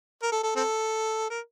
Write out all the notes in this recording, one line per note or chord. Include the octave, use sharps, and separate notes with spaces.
A#4
A4
A4
C4 A4
A#4